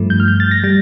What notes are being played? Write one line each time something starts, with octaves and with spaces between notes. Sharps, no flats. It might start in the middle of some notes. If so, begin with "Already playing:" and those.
Already playing: G2 F3 A3
G6
F6
G6
A6
A#6
G3 A6